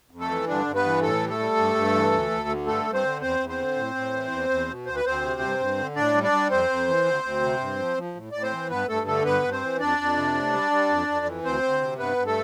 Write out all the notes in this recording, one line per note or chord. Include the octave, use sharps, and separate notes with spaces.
F2
A3 A4
E3
G2 D3 D4
G2
B3 B4
E3
A2 A3 A4
G3
A3 A4
G3
G2
G2
E3
D2
D2
D3
G2 A3 A4
G2
C4 C5
D3
E2 C4 C5
E2
C4 C5
D3
A2
A2
E3
E2
E2
B2
D2 C5
B4
D2 C4 C5
C3
G2
G2
D3
A2 D4 D5
G3
D4 D5
G3
F2 C4 C5
F2
E3
D2
D2
C3
G2
F3
F3
A2
A2 D5
C4 C5
E3
G2 B3 B4
G2 A3 A4
D3 A3 A4
G2 B3 B4
G2
C4 C5
E3
F2 D4 D5
F2
C3
A2
G3
G3
F2
F2
E3
D2 C4 C5
D2
C3
G2 B3 B4
G2
A3 A4